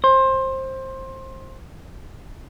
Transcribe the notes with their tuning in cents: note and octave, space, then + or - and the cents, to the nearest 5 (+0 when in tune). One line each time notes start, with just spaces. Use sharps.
C5 +20